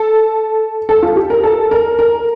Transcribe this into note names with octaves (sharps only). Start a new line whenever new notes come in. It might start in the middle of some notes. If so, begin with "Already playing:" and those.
Already playing: A4
A4
F4
G4
A#4
A4
A#4
A#4